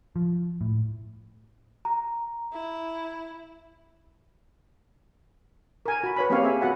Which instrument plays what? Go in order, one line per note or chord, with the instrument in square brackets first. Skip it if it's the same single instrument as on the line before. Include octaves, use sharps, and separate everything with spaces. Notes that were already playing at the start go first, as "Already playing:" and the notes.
[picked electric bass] F3
A2
[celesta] A#5
[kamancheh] E4
[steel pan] A#4 G#5
F#4 B5
B4 C#5 B5
A#3 C4 C#4 G4 C#5 F5
G#4 E5 G#5
B3 F#4 F#5 B5